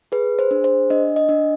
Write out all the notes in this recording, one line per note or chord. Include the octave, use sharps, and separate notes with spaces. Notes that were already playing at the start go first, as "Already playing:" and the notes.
G#4 B4
C5
D4
C5
D4 D#5
D#5
D4